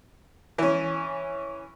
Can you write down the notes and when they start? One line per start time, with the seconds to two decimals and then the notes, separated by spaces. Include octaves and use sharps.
0.58 E3 C#4